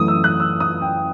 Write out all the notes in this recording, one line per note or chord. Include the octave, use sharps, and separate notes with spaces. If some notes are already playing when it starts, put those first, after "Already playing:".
Already playing: F#2 E3 A3 D#6
E6
F#6
E6
D#6
G5